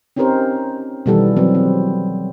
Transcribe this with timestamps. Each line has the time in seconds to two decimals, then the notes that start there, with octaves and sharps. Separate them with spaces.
0.16 C4 C#4 D#4 G4 A#4 C5
1.06 B2 D#3 E3 G3 B3 A4
1.36 E3 F#3 B3 C4
1.55 C4